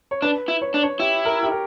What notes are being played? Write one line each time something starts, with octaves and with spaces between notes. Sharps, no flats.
C#5
D4 B4
E4
C#5
D4
C#5
E4 G4
A#4
G4
A#4